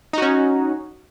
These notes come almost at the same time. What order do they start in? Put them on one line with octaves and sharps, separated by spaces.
D#4 F#4 C#4